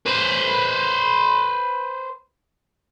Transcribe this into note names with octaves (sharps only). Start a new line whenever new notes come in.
B4 C5